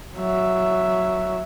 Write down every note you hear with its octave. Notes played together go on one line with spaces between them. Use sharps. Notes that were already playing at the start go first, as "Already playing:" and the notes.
F#3 E5